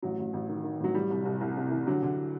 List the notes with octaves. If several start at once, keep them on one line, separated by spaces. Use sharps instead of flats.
A1 F#3
A1
A1
D#3
D#3
A1 F#3
E3 G3
C2
C2
C2
C3
E3
D3 F#3
D3